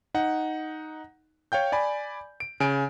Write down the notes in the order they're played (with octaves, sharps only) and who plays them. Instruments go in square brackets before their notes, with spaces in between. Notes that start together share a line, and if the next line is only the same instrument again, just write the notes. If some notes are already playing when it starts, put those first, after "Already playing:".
[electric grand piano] D#4 F#5
C#5 F5 G5 G6
D5 G#5 B5
D7
C#3 G#5 D7